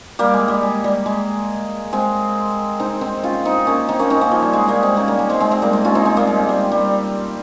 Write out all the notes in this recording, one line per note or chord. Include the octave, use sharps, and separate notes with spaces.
G3 A#3
G#3
G3
G#3
G3
G#3
G#3 C4
C4 D#4
C4 D#4
C#4 F4
C4 D#4
A#3 C#4
C4 D#4
A#3 C#4
C4 D#4
A#3 C#4
F3
G3
G#3
G3 A#3
G#3 C4
A#3 C#4
G3 A#3
G#3
G#3 C4
G#3 C4
G#3 C4
G3 A#3
G#3
C#4 F4
C4 D#4
G#3 C4
G3 A#3
G#3
G3
G3